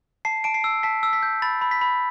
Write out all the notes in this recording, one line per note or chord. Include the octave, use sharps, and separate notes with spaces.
A5 C7
A5 D7
C7
E6
A5 B6
E6
B6
G6
B5 A6
B5
B6
B5